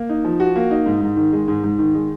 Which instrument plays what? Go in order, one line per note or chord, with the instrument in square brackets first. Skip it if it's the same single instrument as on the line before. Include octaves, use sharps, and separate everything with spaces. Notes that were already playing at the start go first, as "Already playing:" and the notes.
Already playing: [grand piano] A#3
D#4
F3
F#4
A#3
D#4
G#2
G#2
D#3
G#3
G#2
G#2
D#3
G#3